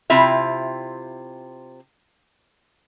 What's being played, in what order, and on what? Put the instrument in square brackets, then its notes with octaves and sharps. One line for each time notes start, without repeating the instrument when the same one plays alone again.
[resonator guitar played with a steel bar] C3 C4 E4 F4 E5